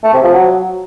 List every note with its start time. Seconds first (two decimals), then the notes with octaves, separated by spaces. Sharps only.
0.03 A3
0.13 C3
0.23 F3
0.33 F#3